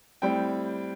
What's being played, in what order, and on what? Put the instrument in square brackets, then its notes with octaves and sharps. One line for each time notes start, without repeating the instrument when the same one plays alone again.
[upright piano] A2 G3 C4 G5